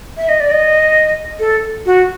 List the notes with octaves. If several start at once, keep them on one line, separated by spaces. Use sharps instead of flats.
E5
D#5
D5
D#5
A4
F#4